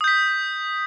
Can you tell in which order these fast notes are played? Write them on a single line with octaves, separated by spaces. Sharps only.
D#6 G6 B6